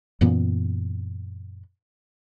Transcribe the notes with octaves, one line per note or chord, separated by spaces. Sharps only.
F#2 A#2 E3 B3